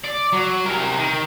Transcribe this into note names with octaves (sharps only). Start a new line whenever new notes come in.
D5
F#3
C3 A#4
D#3